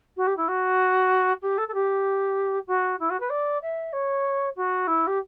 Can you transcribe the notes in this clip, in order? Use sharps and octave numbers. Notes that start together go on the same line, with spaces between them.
F#4
G4
E4
F#4
G4
A4
A4
G4
F#4
E4
F#4
B4
D5
E5
C#5
F#4
E4
G4